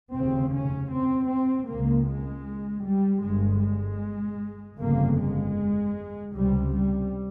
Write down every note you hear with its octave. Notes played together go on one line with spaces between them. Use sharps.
F1 D#2 C#3 C4
C#4
C4
C4
C#2 C#3 A#3
G#3
G3
G1 G2 G#3
G#3
G1 F2 C#3 A#3
G#3
C#2 C3 G3
G3